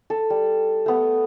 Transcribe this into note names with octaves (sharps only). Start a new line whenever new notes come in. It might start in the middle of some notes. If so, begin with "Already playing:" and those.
A4
G3
A3 B3